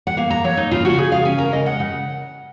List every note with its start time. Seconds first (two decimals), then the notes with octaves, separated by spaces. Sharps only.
0.07 F#5
0.17 A#3 F5
0.30 A#5
0.44 F#3 C#5
0.57 D#4
0.71 C#3 F4
0.85 F#4
0.98 C#3 G#4
1.12 F5
1.25 C#4 G#5
1.38 A#4
1.53 G#3 D#5
1.66 F#5
1.79 C#3 F#5